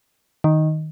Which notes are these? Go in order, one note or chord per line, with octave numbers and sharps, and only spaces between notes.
D#3